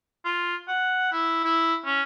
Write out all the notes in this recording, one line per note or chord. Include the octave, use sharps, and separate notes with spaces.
F4
F#5
E4
E4
C#4